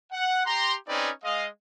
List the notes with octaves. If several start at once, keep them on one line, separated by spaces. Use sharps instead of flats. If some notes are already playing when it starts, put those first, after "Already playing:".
F#5
G4 A#5 C6
C4 C#4 D#4 G#4 B4 D5
G#3 D#5 F5